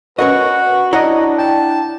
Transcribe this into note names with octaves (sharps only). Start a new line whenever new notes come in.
C#4 F#4 A#4 B4 D#5
D4 E4 C#5 D#5 F#5 A#5
G5 A5